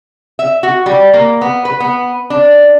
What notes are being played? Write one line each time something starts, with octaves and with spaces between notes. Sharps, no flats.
E5
F#4
G3
A#3
B3
B4
B3
D4